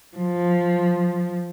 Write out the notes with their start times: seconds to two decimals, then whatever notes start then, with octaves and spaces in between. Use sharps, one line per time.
0.17 F3